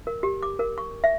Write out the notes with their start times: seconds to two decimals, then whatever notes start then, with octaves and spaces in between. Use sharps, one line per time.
0.07 A#4
0.23 G4
0.43 D6
0.59 A#4
0.78 C#6
1.04 E5